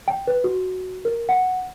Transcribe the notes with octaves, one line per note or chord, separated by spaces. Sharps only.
G5
B4
F#4
A#4
F#5